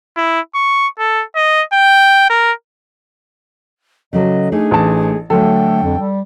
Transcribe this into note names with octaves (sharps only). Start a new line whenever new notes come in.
E4
C#6
A4
D#5
G5
A#4
C#3 F#3 A4 D#5
A3 D4 D#4 G#4
A1 A5
D3 F#3 A3 A4 G5
F2
G3